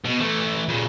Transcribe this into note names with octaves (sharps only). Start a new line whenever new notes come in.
B2
E3 A3
A#2 C#3